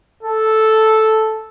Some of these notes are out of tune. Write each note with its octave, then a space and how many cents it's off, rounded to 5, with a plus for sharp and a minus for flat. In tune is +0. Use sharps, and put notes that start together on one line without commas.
A4 -5